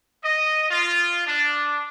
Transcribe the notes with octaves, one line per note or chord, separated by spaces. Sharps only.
D#5
F4
D4